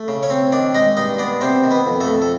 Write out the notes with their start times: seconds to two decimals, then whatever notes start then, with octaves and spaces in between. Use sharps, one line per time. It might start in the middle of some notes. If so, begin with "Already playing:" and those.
Already playing: A3
0.08 C#3
0.23 C#4 C#5
0.30 C4
0.52 D#3 D4 D5
0.75 G#3 D#4 D#5
0.97 G2 D#4 D#5
1.18 B3 D4 D5
1.41 C3 C4 C5
1.64 D#3
1.71 B3 B4
1.85 F2
2.01 A3 A4
2.08 F2
2.22 A4